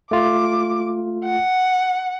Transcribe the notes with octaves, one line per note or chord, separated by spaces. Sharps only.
A3 F4 D6
F#5